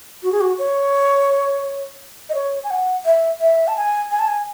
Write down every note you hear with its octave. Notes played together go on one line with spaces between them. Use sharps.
F#4
G#4
F#4
C#5
D#5
C#5
G#5
F#5
E5
E5
A5
G#5
G#5
A5
G#5